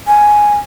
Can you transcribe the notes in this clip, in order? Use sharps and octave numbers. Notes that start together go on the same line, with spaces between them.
G#5